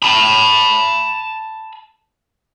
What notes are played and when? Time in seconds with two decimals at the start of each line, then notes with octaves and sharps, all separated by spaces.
0.02 A5 B5